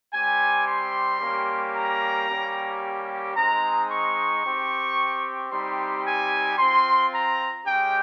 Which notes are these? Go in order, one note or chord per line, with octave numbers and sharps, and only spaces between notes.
G3 C4 G4 G#5
C6
G3 A#3 C#4 G4
A#5
G3 A#3 C#4 G4
G#3 C4 D#4 A#5
C#6
C4 G4
G3 C4 D#4 G4 C6
G#5
C4 F4 C6
A#5
G#3 C#4 G4 G5